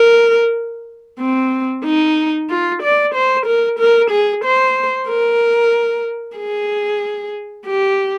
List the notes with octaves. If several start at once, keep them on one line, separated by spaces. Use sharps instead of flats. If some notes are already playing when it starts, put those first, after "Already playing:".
Already playing: A#4
C4
D#4
F4
D5
C5
A#4
A#4
G#4
C5
A#4
G#4
G4